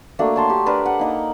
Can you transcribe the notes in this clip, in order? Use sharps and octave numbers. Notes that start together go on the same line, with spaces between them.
A3 A#3 D4 F#4
C#5 A5 C6
G4
D4 A#4 B4 A5
F#5
A#3 D#4